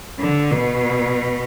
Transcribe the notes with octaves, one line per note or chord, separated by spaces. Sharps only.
D3
B2